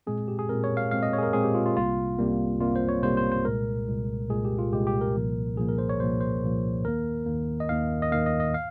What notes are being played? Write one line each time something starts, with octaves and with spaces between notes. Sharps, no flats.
A#2 G#3 C4 G#4
G4
G#4
A#2 G#3 C4 A#4
C#5
F5
A#2 G#3 C4 F5
D#5
C#5
G#4
A#4
A#2 G#3 C4 G#4
G4
F4
F4
C2 C3 G3 A#3 F4
C2 C3 G3 A#3
C2 C3 G3 A#3 F4
C5
C#5
C2 C3 G3 A#3 C5
C5
C5
C2 A#2 G#3 A#4
C2 A#2 G#3
C2 A#2 G#3 G#4
G4
F4
C2 A#2 G#3 G4
G4
A#4
C2 A#2 F3 A#3
C2 A#2 F3 A#3 G#4
A#4
C5
C#5
C2 A#2 F3 A#3 C5
C5
C2 A#2 F3 A#3
D#2 D#3 A#3 A#4
D#2 D#3 A#3
D#5
D#2 D#3 A#3 F5
D#5
D#2 D#3 A#3 F5
D#5
D#5
F5